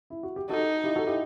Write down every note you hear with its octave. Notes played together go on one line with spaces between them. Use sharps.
E4
F#4
G4
D#4 F#4 A4
E4 G4
F#4 A4
E4 G4